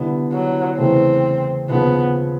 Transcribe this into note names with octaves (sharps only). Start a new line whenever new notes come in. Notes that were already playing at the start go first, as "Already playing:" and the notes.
Already playing: D3 G3 B3 E4
F#3
E2 C#3 E3 A3 C4
D#2 C#3 F3 B3